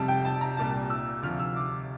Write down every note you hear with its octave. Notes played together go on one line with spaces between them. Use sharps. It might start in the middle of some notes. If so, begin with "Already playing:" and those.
Already playing: F2 C3 G3 A5
G5
A5
A#5
C2 A#2 G3 A5
E6
D2 C3 F3 F6
E6
D6